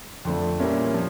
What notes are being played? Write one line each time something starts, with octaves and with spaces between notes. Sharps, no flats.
F2 D3 A3
A#2 G3 A#3 C#4 E4
F3